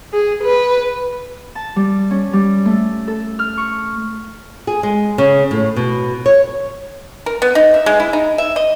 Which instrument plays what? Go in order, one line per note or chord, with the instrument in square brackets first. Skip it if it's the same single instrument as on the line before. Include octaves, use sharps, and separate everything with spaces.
[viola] G#4
B4
[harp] A5
G3
C#4
G3
A3
A4
F6
C#6
[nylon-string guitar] G#4
G#3
C#3
A2
B2
C#5
[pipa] A#4
B3
D#4
E5
G#3
E4
D#4
E5
D#5